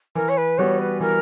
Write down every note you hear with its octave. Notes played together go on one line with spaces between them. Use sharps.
E3 A#4
C#5
B4
G3 B3 F#4 C#5
B4
E3 A#4